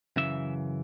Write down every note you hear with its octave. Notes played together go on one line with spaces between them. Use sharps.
F#2 C#3 E3 E5